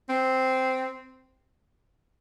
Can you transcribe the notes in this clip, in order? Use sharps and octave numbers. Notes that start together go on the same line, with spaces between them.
C4